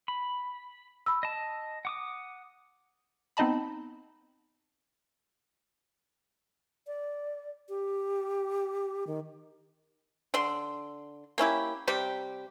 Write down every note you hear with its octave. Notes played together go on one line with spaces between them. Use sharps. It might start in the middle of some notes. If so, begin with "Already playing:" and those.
B5
B5 E6
D#5 A5
F#5 D6 D#6
B3 C4 D#4 D#5 A5 B5
D5
G4
D#3
D3 D5 C6
A#3 C#4 E4 G4
C3 G3 G4